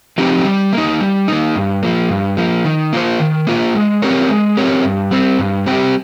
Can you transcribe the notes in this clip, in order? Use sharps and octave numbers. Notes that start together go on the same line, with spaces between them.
F3 C4 D#4 G4
G3
A#3 D#4
G3
A#3 D#4
G2
F3 A#3
G2
F3 A#3
D#3
A#3 F4 C5
D#3
A#3 F4 C5
G#3
C4 G4 A#4 C#5
G#3
C4 G4 A#4 C#5
G2
G3 C4 G4
G2
G3 C4 G4